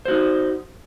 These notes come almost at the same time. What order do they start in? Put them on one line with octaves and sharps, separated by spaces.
C5 F#4 D#4